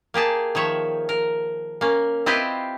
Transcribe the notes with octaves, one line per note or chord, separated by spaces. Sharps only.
A#3 G4 G#4 A5
D#3 F3 C#5 E5
A#4
A#3 C#4
C4 E4 F4 G4 B4 D#5